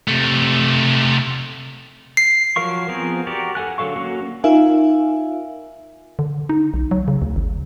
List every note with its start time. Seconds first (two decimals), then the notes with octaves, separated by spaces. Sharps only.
0.08 C3 A3
2.17 C7
2.56 F3 F#3 A#4 F5 C#6
2.88 F3 B3 C4 G#4 A#4
3.27 F#4 G4 A#4 D5
3.55 A4 F#5 G#5 F#6
3.78 D3 F#3 A4 F5 C#6
3.96 F#3 A#3 C#4 F#4
4.44 D#4 F4 A#4 E5 F5 G#5
6.19 D3
6.49 D#4
6.74 B1
6.91 F#3
7.08 C#3
7.22 D2
7.36 G#1